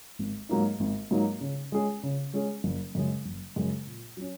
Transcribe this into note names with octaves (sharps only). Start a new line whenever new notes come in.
G#1
G#2 F#3 A#3 D#4
G#1
G#2 F#3 A#3 D#4
C#3
G#3 C#4 G#4
C#3
G#3 C#4 G#4
F#1
F#2 C#3 G#3
F#1
F#2 C#3 G#3
A#2
F#3 C#4